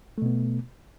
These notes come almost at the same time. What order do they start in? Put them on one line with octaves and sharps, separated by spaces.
A3 B2 B3